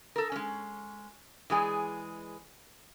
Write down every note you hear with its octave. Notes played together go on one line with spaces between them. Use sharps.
A4 A#4
G#3 C#4
E3 G#3 G#4 D5